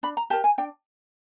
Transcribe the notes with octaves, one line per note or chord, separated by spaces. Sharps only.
D4 B5
A#5
G4 A#4 A5
G#5
D4 G5